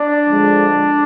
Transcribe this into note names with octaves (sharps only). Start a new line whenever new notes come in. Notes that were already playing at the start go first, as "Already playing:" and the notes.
Already playing: D4
D3 F3 G#3